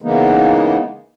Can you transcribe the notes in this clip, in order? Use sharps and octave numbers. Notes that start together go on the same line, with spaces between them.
C#3 E3 G#3 A#3 B3 D#4